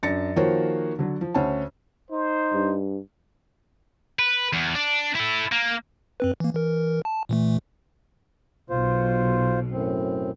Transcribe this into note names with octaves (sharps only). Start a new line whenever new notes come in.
F#2 D4 A6 A#6 C#7
D#3 F3 A#3 F#4 C5 C#5
D3 F#3
F3
D2 C#4 C5 C#5 F#5 A5
D#4 C5
G2
B4
E2
D4
E4 A4
A#3
F#2 C4 B4
E3 A#3
E3 A#4
A5
A#2 E3 A3
B1 B2 F4 C5
F#2 A2 C4